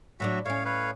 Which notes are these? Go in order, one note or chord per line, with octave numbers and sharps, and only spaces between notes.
A2 F#3 D4 F#4 E5
A2 C#4 C#5 F5
B4 C#5 F5